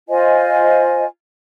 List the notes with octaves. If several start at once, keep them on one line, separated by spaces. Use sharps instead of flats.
F4 C5 D#5 G#5